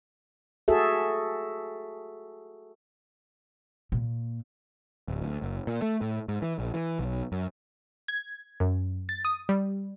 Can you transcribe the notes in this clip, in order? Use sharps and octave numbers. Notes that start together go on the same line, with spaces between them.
F#4 G#4 A4 E5
A#2
D1
D2
F#1
A#2
A3
A2
G#2
E3
A#1
E3
B1
F#2
G#6
F#2
A6
D#6
G3